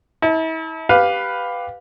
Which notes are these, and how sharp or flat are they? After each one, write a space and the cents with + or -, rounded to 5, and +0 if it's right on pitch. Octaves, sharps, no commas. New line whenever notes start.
E4 -40 A5 +10
G4 +0 B4 +5 F5 +15